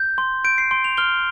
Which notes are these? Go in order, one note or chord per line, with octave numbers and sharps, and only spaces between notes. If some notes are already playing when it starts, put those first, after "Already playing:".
Already playing: G6
C6
G6 D7
C7
C6 D7
F7
F6 G7